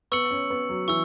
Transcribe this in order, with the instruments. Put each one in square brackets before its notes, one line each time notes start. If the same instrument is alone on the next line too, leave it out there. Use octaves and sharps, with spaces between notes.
[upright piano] B3 [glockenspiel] C#6 E6 C#7 F#7
[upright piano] C#4
B3
F#3
[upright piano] E3 [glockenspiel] C#6 E6